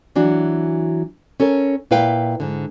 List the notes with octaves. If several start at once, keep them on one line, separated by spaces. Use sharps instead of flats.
E3 F#3 D4 F#4
C#4 A4 A#4 C#5
A#2 E4 B4 F5 G5
G#2 D3